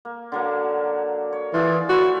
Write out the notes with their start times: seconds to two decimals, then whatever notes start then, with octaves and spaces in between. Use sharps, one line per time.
0.05 A#3
0.32 D3 F#3 A#3
1.33 C#5
1.54 E3 F4 G#4 D5
1.89 A3 E4 F#4 C#5